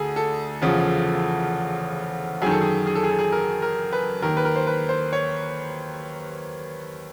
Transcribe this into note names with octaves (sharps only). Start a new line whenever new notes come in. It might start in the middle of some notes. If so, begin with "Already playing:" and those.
Already playing: D2 G#4 A4
A4
E2 C#3 F3
F#2 D#3 G#4
A4
G#4
G#4
A4
G#4
A4
G#4
A#4
A#4
B4
D#2 D#3 A#4
B4
A#4
C5
B4
C5
C#5